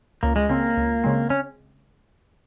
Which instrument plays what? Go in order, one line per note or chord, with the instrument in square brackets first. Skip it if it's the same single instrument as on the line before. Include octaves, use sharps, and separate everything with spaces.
[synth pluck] C#2 [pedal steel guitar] A#3
[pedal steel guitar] G#3
[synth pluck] C#3 G#3 C4 [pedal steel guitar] A#3
[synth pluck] C#2
C#3 G#3 C4
[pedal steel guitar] C#4